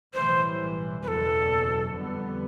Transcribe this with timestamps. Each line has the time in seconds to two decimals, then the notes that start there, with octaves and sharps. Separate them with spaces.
0.14 B1 A2 E3 G3 C5
1.03 F#1 E2 B2 F#3 A4 B4
1.92 F2 D3 G3 B3